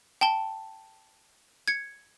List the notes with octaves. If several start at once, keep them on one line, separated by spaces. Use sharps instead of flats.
G5 A5 G7
G#6 C#7